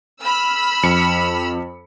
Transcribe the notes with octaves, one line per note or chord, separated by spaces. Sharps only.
B5 E6 F6
F2 C#7